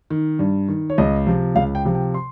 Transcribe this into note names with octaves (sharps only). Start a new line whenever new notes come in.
D#3
G2
D#3
C#5
C#2 D#5
C3 F3
C#2 F5
G5
C3 F3
G5
C6